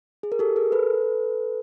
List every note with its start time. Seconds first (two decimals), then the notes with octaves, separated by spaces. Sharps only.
0.23 G#4
0.32 A#4
0.39 G4 A4
0.56 G#4 A#4
0.72 A4 B4